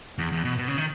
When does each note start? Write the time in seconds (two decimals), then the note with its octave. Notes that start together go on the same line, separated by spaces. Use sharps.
0.18 E2
0.32 E2
0.45 B2
0.58 B2
0.68 C#3
0.78 D#3